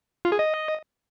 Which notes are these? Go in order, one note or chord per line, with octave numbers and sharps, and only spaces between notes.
F4
G#4
D#5